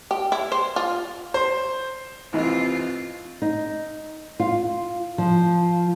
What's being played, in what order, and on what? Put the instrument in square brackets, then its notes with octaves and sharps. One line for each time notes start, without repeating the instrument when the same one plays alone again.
[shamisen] G4
E4
C5
F4
[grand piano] C5
[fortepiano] C2 E3 D#4 [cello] C4 F4
[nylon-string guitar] D#4
F4
F3